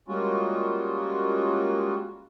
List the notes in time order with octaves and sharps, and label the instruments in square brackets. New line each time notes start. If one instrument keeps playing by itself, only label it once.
[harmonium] G3 G#3 A#3 C#4 F4 F#4